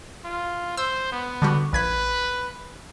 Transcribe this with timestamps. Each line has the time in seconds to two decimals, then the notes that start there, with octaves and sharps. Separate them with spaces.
0.24 F4
0.77 C5 E6
1.12 B3
1.42 D3 G3 F#4
1.73 A#1 B4 G#6 B6